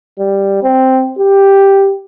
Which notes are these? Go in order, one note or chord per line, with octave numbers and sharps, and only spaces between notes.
G3
C4
G4